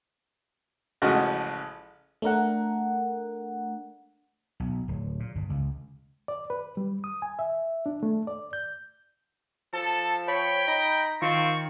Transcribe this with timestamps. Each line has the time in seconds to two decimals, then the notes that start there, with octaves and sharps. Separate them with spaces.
1.02 A1 C#3 F3 G#3 F#4 D#5
2.22 A3 D4 A#4 F#5
4.60 B1
4.88 D1
5.20 A#2
5.35 G1
5.49 C#2
6.28 D5
6.50 B4
6.77 G3
7.04 D#6
7.22 G#5
7.39 E5
7.86 D4
8.03 A3
8.27 D5
8.53 G6
9.73 F3 A4 A5
10.28 C#5 G5 B5
10.68 D#4 B5 A#6
11.22 D#3 C4 F4 C#6